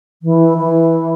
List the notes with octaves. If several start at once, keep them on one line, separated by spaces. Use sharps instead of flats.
E3
E3